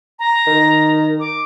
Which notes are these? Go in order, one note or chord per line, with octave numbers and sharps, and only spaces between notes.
A#5
D#3
D6